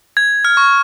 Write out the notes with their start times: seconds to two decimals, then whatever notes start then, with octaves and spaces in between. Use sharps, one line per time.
0.17 G#6
0.45 F6
0.57 C#6